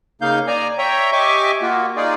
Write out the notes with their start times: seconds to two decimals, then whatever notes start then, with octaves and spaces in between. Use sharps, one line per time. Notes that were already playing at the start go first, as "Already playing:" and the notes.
0.22 C#3 A#3 D#4 F5 G6
0.47 D5 G#5 A#5
0.78 C#5 E5 G5 A#5
1.12 G4 D#5 E5 G#5 C#6 D6
1.62 A#3 F4 F#4
1.96 D#4 F4 G#4 D5